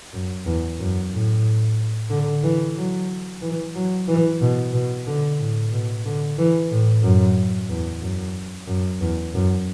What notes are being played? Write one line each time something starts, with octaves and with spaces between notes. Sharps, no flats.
F#2
E2
F#2
A2
D3
E3
F#3
E3
F#3
E3
B2
B2
D3
A2
B2
D3
E3
A2
F#2
E2
F#2
F#2
E2
F#2